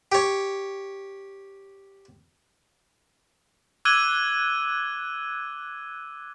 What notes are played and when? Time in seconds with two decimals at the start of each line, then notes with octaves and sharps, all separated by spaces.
0.12 G4 C#5
3.85 D6 E6 F#6 G#6 D#7 G7